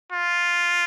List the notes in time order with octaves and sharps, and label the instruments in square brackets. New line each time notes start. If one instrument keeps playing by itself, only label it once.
[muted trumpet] F4